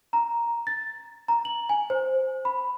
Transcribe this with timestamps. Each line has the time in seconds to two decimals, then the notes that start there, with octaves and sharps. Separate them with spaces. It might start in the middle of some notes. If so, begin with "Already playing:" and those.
0.13 A#5
0.67 A6
1.28 A#5
1.45 F#7
1.69 G#5
1.90 C5
2.45 B5